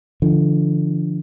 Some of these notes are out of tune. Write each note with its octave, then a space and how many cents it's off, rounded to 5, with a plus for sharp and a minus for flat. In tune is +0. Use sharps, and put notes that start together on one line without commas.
D3 +0 F3 -30